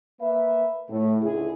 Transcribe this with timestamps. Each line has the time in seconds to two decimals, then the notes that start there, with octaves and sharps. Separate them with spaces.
0.21 A#3 B4 E5
0.90 A2
1.22 C#2 D3 E4 G#4